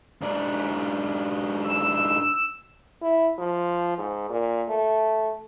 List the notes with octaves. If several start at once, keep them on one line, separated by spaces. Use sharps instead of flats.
G#2 D4
E6
E4
F3
G#2
A#2
A3